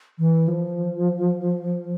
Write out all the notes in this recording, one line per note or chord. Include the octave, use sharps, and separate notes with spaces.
E3
F3